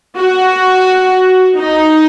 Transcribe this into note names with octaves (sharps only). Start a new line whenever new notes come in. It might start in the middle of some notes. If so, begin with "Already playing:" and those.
F#4
D#4